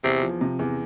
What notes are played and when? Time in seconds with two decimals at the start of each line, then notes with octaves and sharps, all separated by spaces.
0.04 E2 C3
0.22 F3
0.41 C3
0.59 E2